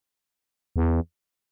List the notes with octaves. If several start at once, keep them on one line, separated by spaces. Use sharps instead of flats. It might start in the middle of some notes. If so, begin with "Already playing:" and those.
E2